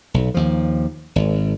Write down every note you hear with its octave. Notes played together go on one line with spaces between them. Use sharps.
B1
D#2 F3
G#1